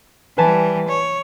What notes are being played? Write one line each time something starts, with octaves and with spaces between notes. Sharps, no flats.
E3 G3 B4 G#5 A5
C#5